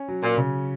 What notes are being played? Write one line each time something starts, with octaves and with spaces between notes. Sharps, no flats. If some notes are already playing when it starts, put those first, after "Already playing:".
Already playing: C#4
F#3
A#2
C#3